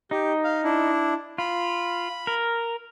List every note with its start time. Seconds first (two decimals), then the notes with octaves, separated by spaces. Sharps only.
0.11 D#4 G4
0.44 F5
0.64 D4 E4
1.38 F4 B5
2.27 A#4